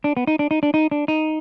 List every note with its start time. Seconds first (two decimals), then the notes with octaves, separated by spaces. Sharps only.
0.04 D4
0.17 B3
0.27 D#4
0.39 D4
0.51 D#4
0.63 D4
0.74 D#4
0.91 D4
1.08 D#4